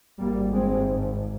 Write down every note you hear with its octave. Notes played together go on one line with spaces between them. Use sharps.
G#1 G#2 G3 A#3
G#3 C4